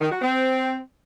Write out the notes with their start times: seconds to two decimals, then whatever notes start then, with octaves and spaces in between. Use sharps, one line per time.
0.01 D#3
0.12 F#4
0.22 C4